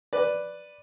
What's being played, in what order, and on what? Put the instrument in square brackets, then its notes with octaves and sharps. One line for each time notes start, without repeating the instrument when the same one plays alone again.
[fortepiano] B4 D5